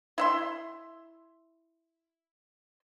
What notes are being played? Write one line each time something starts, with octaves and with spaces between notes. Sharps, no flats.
E4 E5 C6